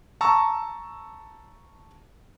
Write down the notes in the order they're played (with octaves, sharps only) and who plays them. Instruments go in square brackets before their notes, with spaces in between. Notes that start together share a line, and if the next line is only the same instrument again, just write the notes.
[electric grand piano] A5 A#5 C#6 E6